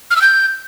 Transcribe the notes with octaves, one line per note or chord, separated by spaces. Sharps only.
F6
E6
G6